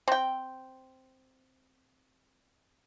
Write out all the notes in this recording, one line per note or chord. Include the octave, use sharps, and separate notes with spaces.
C4 G5